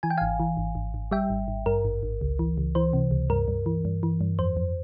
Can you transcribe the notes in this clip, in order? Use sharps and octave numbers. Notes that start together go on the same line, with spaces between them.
E3 G#5
G5
G#1 F5 G#5
E3
G#1
G#1
G#1
G3 E5 G5
G#1
G#1
G2 A#4
G#1
G#1
C#2
E3
C#2
E3 C5
C3
C#2
G2 A#4
G2
E3
G2
E3
G2
F2 C5
F2